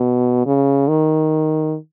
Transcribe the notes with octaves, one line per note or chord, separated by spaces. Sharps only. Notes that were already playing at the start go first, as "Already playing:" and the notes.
Already playing: B2
C#3
D#3